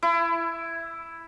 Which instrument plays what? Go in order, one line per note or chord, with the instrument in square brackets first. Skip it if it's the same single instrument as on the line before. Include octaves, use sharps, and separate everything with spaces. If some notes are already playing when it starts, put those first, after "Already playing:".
[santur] E4